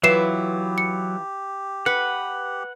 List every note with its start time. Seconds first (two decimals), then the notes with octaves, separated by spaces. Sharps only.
0.03 E3 F#3 E4 F4 G4 B4 C7 E7
0.78 C#7
1.86 B4 F#5 C#7